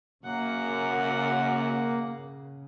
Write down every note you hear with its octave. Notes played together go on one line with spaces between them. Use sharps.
F#2 C#3 A#3 F#5